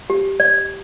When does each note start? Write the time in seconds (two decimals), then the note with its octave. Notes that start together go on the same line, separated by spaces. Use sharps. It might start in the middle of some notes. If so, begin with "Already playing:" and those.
0.10 G4
0.40 D5